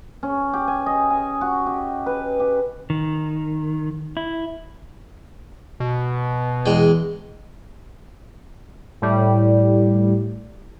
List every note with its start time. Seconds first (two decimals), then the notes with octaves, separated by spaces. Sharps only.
0.23 C#4
0.53 G4
0.68 G#5
0.86 D#5
1.10 G#5
1.41 F#4
1.66 G4
2.06 B4
2.40 G4
2.90 D#3
4.17 E4
5.80 B2
6.66 E2 G#3 G5
9.02 A2 G3